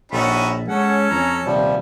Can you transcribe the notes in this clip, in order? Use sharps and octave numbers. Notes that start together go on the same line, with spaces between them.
A#1 A2 C#4 D#4 F#4 A4 B5
G#3 C#4 A4 F#5
F2 A#5
D#1 C3 F3 G3